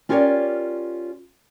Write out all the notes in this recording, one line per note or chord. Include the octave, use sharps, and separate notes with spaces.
C#4 F4 G4 A#4 C#5 D5